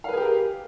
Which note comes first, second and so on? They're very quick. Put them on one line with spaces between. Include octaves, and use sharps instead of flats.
F5 B4 G#4 G4 A#4